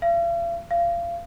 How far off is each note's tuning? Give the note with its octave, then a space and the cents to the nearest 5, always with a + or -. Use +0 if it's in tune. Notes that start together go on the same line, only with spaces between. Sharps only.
F5 -45
F5 -30